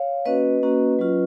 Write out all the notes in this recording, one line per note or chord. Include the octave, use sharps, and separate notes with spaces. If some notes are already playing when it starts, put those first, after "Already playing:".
Already playing: C#5 F5
A#3 C#4 F#4 B4 D#5
A#3 C#4 F#4
F#3 C#4 F4